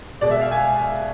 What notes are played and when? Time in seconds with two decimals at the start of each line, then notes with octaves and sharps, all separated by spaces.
0.21 B2 G#3 D5
0.31 E5
0.41 F5
0.51 G#5